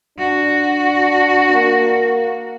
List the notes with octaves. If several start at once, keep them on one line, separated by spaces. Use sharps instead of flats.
D4 F#4
A#3